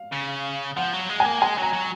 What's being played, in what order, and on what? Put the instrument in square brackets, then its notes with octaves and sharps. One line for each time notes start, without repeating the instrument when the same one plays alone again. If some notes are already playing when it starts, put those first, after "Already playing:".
Already playing: [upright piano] F5
[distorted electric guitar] C#3
[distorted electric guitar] F3 [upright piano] F#5
[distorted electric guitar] F#3
G#3
[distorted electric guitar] A#3 [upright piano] G#5
[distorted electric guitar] G#3 [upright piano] G#5
[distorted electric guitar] F#3 [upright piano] A#5
[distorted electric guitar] F#3